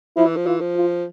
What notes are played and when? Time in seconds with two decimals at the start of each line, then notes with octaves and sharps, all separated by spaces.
0.16 F3 E4
0.26 E3
0.36 F3
0.46 E3 F4
0.60 F3
0.76 F4